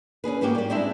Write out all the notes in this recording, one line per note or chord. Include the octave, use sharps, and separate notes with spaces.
C#4 D4 G#4 B4
G#2 G#3 A#3 F#4 G4
G3 G4
G3 G#3 C4 D4 E4 E5